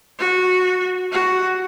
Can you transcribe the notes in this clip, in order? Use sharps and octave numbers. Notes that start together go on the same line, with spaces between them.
F#4
F#4